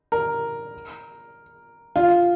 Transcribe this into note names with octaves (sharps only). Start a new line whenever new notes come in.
A#4
F4